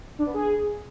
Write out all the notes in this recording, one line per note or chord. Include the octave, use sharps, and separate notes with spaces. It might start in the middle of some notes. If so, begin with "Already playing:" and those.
D4
B3
G#4